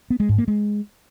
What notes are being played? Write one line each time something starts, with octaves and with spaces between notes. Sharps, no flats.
B3
G#3
G#2
A#3
G#3